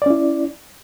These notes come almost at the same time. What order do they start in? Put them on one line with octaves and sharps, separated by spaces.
D5 C#4 E4